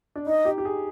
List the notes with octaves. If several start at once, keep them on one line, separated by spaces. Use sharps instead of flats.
D4
D#4 D#5
G4
G4
G#4